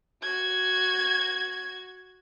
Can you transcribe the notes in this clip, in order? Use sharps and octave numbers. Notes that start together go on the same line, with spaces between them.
F#4 G#6